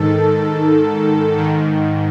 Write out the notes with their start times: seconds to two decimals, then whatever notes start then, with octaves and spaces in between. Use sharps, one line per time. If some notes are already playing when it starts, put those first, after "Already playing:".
Already playing: G#2 D#3 A4
1.37 G#2 D#3